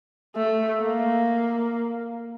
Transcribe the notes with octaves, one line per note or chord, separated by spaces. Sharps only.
A3
A#3